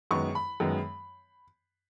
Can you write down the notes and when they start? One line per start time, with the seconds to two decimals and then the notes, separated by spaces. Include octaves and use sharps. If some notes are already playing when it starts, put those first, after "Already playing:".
0.11 F#2 D#3 G#3 B3 C#6
0.35 B5
0.60 F#2 D#3 G#3 B3